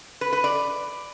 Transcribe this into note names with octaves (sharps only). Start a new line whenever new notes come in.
B4
B4
D5